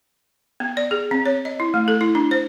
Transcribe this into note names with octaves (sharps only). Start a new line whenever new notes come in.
B3
D5
G#4
C4
C#5
D#5
E4
A3
A4
E4
D4
C5